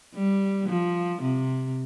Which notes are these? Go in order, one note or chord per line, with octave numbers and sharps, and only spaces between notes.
G3
F3
C3